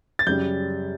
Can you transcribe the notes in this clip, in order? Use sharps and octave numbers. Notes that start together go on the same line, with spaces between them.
A6
F#2 C#3 G3 G6